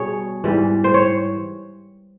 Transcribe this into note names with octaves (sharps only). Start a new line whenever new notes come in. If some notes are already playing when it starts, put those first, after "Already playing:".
Already playing: B2 G3 G#4 C#5
G#2 E3 G3
C5
C#5